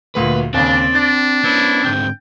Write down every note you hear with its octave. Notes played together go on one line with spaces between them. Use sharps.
D1 D2 A#2 B4
D#2 C#3 C4 D4 D5
D4 A6
B3 C#4 E4
G#2 D3 C4 G5